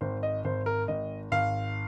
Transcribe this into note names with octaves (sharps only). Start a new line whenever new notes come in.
G#1 C5
D#5
G#1 C5
A#4
G#1 D#5
G#1 F5